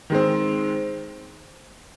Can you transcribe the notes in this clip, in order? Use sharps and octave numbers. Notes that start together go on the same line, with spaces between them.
D#3 G#3 C4